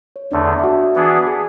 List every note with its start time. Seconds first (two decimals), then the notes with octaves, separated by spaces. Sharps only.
0.16 C#5
0.32 E2 D3 A3 D4 D5
0.59 E5
0.64 F#4 F#5
0.95 E3 B3 D4 G#4
1.27 G#4 G#5